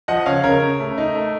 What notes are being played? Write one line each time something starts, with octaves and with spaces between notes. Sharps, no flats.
F3 D#5 F#5
C#3 C#5 F5
C#3 A#4 C#5
C#3
A3
D#4
A3